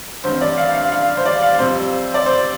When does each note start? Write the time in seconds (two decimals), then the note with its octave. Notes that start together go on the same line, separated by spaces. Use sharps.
0.24 A1 G2 G3 C4 C5
0.41 D5
0.57 F5
0.75 F5
0.92 F5
1.17 C5
1.25 D5
1.42 F5
1.59 F2 C3 G3 C4 C5
2.14 D5
2.26 C5